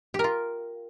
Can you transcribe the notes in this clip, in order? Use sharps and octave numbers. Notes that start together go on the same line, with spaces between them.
F4 G4 A#4